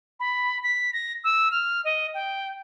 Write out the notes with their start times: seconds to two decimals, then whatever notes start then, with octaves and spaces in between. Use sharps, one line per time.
0.20 B5
0.63 B6
0.93 A#6
1.24 E6
1.51 F6
1.85 D#5
2.14 G5